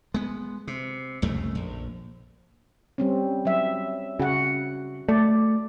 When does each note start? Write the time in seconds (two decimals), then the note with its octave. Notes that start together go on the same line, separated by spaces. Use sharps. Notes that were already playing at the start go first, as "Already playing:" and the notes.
0.14 G#3 B3
0.67 C3
1.22 C2 F2 C#3 A3
1.55 A#1
2.98 G3 C4 C#4
3.45 F#3 E5
4.20 C#3 F#4 F#5
5.09 A3 D5